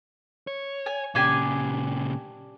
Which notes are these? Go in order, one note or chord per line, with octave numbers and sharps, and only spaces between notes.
C#5
G#5
A#2 C#3 D4 G4 G#5